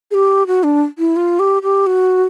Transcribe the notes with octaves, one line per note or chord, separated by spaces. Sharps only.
G#4
G4
F#4
D4
E4
F4
G4
G4
F#4